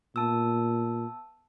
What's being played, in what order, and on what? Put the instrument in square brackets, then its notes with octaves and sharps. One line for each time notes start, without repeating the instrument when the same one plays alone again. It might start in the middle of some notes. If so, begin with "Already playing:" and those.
[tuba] A#2 [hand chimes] B3 A5 E6